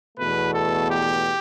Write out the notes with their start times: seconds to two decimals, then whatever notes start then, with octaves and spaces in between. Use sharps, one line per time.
0.18 E2 B2 A3 B4
0.54 A4
0.90 G4